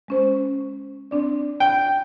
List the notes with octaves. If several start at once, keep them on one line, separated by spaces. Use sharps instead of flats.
G#3 C#4 C5
C4 D4 D5
G5